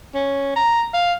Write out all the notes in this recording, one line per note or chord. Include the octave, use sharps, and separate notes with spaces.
C#4
A#5
F5